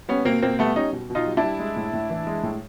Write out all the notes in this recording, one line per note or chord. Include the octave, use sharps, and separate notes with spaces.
G3 B3 C#4
B2 A#3 C4
B2 A#3 C4
G3 A3 B3
G3 C#4 D#4
B2
B2
D#4 F4
G3
D4 E4
G3
G#3
A2
A2
E3
G#3
A2